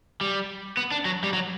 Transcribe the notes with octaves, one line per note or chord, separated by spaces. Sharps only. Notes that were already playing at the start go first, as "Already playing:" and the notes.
G3
B3
D4
F#3
G3
F#3